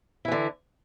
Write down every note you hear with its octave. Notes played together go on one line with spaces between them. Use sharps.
D3 E3 E4